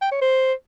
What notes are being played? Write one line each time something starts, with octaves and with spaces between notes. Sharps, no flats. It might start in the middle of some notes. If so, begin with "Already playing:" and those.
G5
C#5
C5